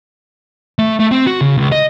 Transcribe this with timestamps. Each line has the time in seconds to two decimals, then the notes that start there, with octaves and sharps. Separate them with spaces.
0.79 A3
1.00 A3
1.11 C4
1.27 F#4
1.41 C#3
1.58 C#2
1.72 D#5